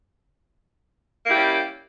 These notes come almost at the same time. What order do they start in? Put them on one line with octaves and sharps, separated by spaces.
A#3 E4 G4 G3 C#4